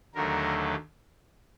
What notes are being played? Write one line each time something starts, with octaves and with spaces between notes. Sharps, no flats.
D#2 D3 F#3 A3 A#4